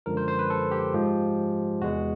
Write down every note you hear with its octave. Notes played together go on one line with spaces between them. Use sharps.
F#2 D3 F3 G#3 A#4
C5
C5
B4
A4
G4
G#2 F3 G#3
E2 C3 E3 G#3 F#4